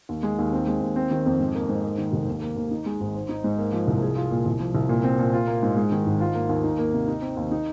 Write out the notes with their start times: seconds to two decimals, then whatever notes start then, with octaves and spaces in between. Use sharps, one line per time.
0.09 D#2
0.23 G#3
0.39 D#2
0.53 C4
0.67 G#3
0.82 D#2
0.96 C4
1.11 D#3
1.26 F2
1.40 G#2
1.55 A#3
1.69 G#2
1.84 A#3
1.98 D#3
2.13 F1
2.28 D#2
2.42 A#3
2.57 D#2
2.71 D#4
2.86 G#3
3.01 G#1
3.14 C5
3.29 D#4
3.44 G#2
3.58 A#3
3.72 F3
3.88 C2
4.02 G#4
4.17 F4
4.31 A#2
4.46 C2
4.60 F3
4.75 C2
4.89 A#2
5.04 C4
5.19 A#2
5.34 F4
5.47 A#3
5.63 G#2
5.77 G#3
5.92 D#3
6.06 G#1
6.20 F4
6.35 A#3
6.49 D#2
6.64 D#4
6.78 A#3
6.93 C3
7.08 D#4
7.22 C4
7.37 D#2
7.51 D#4